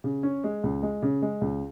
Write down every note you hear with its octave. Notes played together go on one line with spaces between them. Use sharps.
C#3
C#4
G#3
C#2
G#3
C#3
G#3
C#2